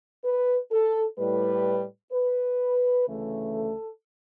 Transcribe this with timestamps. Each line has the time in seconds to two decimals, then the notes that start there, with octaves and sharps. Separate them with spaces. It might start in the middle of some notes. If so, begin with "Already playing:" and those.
0.24 B4
0.71 A4
1.18 A2 G3 B4
2.12 B4
3.07 D2 C#3 E3 A3
3.54 A4